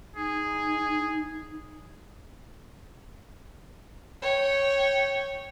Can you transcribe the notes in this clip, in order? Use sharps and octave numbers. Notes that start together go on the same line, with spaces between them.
D#4 G#4
C#5 G5